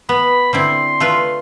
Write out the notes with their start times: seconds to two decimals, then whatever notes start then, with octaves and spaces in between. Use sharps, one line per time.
0.09 B3 B5
0.53 D3 C4 E4 C6
1.00 A3 F4 B4